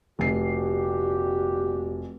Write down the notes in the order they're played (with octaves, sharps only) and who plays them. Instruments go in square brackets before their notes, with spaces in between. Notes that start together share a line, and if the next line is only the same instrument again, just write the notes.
[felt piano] F1 C7 [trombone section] A#2 F#4 G4